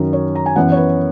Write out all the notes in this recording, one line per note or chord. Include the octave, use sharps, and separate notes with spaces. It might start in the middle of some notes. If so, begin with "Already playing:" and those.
Already playing: F#2 D#3 F#3 A#4
C#5
A#5
G#5
F#2 E3 B3 F#5
C#5
B4